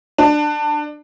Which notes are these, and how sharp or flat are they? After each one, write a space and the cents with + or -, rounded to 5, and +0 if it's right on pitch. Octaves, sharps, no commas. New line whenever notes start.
D4 +20